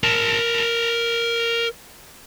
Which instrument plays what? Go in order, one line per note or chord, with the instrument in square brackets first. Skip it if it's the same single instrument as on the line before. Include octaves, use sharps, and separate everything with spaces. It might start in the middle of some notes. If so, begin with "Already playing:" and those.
[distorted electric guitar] A#4 A5